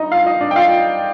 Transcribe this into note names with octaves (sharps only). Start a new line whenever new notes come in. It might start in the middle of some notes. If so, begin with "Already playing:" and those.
Already playing: G2 D#4 D#5 A#5
F4 F5
D#4 D#5
D4 D5
G5
F4 F5